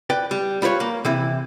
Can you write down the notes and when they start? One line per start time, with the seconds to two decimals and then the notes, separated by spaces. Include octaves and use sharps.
0.10 B4 D5 G5
0.31 G3
0.62 G3 F4 B4 C#5
0.80 A#3
1.05 C3 E3 E4